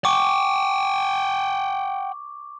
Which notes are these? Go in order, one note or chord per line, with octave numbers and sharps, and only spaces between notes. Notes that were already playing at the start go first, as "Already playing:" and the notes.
F#5 G5 C#6 D6